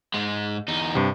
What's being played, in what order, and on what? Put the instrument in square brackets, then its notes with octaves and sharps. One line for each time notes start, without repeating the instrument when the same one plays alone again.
[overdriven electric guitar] G#2 G#3
E2 D#4
[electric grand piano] G2 C3